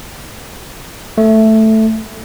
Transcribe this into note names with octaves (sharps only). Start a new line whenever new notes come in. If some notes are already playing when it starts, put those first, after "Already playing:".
A3